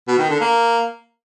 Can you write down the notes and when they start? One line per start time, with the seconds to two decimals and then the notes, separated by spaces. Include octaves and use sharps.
0.08 B2
0.19 D#3
0.30 D3
0.40 A#3